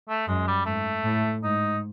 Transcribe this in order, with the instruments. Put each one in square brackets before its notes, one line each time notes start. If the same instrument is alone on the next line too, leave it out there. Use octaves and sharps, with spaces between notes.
[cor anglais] A3
[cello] F#2 [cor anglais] G#3
[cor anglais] G3
[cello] G#2 [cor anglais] A3
[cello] A2
[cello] G#2 [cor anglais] D#4